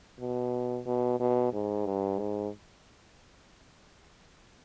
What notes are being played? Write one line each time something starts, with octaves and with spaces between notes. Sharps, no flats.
B2
B2
B2
G#2
G2
G#2